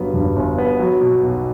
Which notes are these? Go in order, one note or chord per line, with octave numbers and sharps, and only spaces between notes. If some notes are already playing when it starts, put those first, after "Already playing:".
Already playing: G1 G2 F#3 B3
G2
G1
B3
F#3
B2
B1